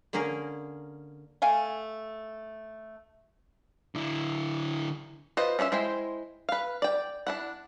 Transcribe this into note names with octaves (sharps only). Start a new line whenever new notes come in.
D3 A#3 C#4 G#4 A#4
A3 F5 G#5
D3 E4
F4 B4 C5 D#5
C#4 D4 F4 E5
G#3 E4 C5 G5
B4 F5
D5 G5
D4 E4 F#5